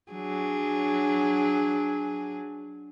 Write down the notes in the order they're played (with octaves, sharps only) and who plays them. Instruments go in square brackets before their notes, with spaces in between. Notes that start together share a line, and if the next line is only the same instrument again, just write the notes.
[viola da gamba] F#3 D4 G#4